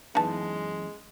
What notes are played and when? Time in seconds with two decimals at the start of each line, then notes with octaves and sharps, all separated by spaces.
0.15 F#2 E3 G#3 B3 D#4 A5